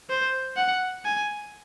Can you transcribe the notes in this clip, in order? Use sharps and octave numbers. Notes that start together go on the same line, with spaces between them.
C5
F#5
G#5